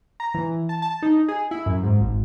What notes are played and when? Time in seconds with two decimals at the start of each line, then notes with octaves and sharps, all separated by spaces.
0.20 A#5
0.34 E3
0.69 A5
0.82 A5
1.02 D#4
1.28 G#4
1.51 E4
1.66 F#2
1.83 G#2
2.01 G#1